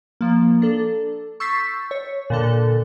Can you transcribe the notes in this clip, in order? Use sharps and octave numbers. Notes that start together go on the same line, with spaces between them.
F3 A#3
D4 A4
C#6 E6 G6 A6 B6 C7
C#5
A#2 D3 A4